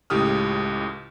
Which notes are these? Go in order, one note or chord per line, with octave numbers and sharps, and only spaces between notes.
C#2 A2 G4 D#6 F6